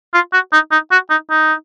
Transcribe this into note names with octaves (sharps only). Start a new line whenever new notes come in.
F4
F#4
D#4
D#4
F#4
D#4
D#4